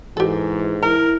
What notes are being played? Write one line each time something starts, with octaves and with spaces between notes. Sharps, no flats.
G#2 E3 G4 A4
E4 A#4 A#5